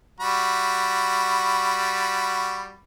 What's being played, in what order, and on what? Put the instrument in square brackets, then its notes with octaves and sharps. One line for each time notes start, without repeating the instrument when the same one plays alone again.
[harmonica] G3 F#4 B5